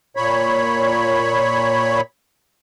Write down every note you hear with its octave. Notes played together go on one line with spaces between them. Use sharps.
A#2 C#5 B5